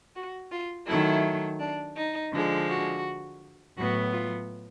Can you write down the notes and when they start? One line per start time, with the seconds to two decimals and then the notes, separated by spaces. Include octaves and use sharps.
0.16 F#4
0.51 F4
0.87 D#3 F#3 A3 E4
1.60 D4
1.97 D#4
2.33 D3 F3 G#3
2.69 F#4
3.77 A2 F#3 B3 F#4
4.13 F4